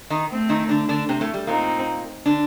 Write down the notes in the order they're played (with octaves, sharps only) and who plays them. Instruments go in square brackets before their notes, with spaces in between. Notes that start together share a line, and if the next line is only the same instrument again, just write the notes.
[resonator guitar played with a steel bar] D#3 D#4
[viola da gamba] A3 C4
[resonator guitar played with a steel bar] D#3 D#4
D3 D4
D3 D4
C3 C4
A2 A3
G3
[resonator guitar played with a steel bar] A#2 A#3 [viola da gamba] C4 D#4
[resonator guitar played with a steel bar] D3 D4